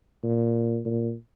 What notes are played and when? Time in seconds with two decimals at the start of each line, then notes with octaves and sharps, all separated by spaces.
0.23 A#2
0.85 A#2